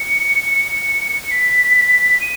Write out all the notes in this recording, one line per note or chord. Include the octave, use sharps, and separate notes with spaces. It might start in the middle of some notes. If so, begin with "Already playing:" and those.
Already playing: C#7
B6
D#7